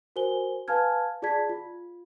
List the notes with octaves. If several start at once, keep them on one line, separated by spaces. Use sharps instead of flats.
F#4 A#4 C5 G#5 G7
B4 F5 G#5 A5 F6 G#6
F4 G#4 D5 A5 G#6 B6
F4